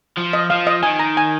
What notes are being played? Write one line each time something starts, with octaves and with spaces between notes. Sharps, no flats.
F3
D#5
F3 F5
D#5
D#3 G#5
A#5
G#5